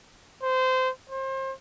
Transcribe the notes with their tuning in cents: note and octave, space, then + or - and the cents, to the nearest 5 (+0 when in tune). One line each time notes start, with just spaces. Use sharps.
C5 -20
C5 +30